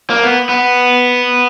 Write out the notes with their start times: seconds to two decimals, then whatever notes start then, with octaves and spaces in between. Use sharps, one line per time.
0.10 A#3
0.23 B3
0.49 B3